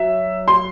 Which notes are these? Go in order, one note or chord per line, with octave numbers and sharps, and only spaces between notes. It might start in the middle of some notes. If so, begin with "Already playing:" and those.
Already playing: F#3 E5
C6